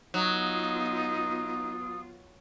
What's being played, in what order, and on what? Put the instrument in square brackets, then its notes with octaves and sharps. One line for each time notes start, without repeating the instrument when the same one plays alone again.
[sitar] F#3 [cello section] B3 F4 [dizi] D#4 [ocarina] D#6